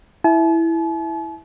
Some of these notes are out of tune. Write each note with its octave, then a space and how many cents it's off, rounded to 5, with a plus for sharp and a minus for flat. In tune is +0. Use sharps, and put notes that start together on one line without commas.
E4 +0 A5 -45